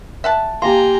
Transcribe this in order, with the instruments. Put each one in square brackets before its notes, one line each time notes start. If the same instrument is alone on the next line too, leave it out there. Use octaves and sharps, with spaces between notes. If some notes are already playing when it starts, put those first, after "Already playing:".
[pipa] E5 F#5 A5
[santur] A#3 G4 [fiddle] G#5 A#5 [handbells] C6